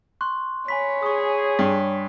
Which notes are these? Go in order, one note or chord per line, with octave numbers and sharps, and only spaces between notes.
C6 C#6 F#6
C#5 G#5 B5 B6
G#4 C#6 D#6
G2 G#6